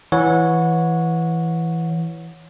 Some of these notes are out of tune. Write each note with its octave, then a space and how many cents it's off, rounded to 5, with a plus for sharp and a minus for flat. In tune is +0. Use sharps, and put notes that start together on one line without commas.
E3 +0 C#5 +0 F#5 -25